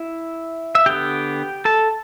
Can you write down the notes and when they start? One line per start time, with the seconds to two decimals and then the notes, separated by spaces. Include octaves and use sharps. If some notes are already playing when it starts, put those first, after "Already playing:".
Already playing: E4 E5
0.75 E5
0.86 D3 B3 G4 G5
1.65 A4 A5